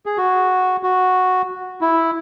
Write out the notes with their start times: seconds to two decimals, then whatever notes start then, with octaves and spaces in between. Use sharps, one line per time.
0.06 G#4
0.18 F#4
0.83 F#4
1.81 E4